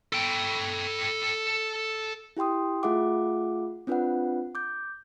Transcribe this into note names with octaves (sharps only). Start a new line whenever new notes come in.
A4 G5
E4 G4 G5 C6 D#6
A3 F4 G#4 E5 F#5 D6
C4 D4 F4 B4 D5 F#5
D6 G6